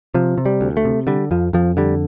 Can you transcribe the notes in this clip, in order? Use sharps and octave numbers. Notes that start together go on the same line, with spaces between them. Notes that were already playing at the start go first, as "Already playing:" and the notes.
C3 F3
C3
G3
D2
A3
C3
D3 G3
F2 F3
F2 F3
D3 G3